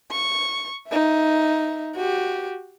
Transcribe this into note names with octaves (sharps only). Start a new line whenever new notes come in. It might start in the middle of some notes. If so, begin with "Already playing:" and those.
C#6
D#4 E5
F#4 G4